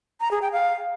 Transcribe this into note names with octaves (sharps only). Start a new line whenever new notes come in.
A#5
G#4
G5
F5